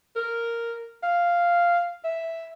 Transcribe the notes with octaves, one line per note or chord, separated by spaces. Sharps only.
A#4
F5
E5